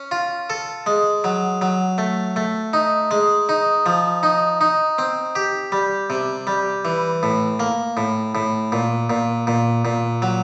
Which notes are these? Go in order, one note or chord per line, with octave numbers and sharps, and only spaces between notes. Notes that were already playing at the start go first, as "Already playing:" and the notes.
Already playing: C#4
F4
A4
G#3
F#3
F#3
A3
A3
D#4
G#3
D#4
F3
D#4
D#4
C4
G4
G3
C3
G3
E3
A2
A#3
A2
A2
A#2
A#2
A#2
A#2
F#3